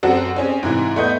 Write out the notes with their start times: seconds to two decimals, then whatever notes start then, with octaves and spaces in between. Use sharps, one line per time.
0.03 F#2 C4 F#4 A4
0.36 C4 C#4 G#4
0.63 G#2 C3 E3
0.96 A3 B3 D#5 G6